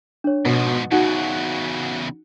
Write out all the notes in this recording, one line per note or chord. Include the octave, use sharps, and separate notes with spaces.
D4 C#5
G#2 B2 F3
E2 C#3 D#4 F#4